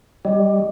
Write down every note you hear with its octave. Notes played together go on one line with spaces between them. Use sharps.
G3 D#5